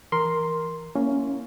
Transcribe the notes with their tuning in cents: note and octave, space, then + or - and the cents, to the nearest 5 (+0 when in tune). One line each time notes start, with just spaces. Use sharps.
E3 +0 A#4 +0 C6 +0
A#3 +10 C#4 +10 E4 +0